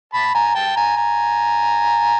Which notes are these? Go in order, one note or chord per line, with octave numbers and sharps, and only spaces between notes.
A5 B5
G#5 A#5
G5 A5
G#5 A#5
G#5 A#5